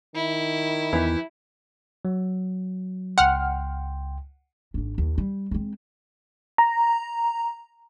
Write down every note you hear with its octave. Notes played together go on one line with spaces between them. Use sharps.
D#3 E4
E2 E3 G4
F#3
C#2 F#5 G5 C6 F6
G#1 D4
D#2
G3
G#3 C4
A#5